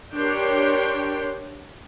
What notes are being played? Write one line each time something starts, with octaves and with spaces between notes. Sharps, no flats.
D4 G4 A#4 C#5 G5 C6